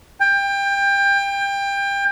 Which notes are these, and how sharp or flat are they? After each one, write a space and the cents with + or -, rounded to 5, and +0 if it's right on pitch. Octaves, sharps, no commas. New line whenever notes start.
G5 +25